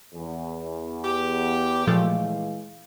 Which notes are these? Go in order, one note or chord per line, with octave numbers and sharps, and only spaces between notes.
E2
G4
A#2 E3 F3 G#3 A3 F5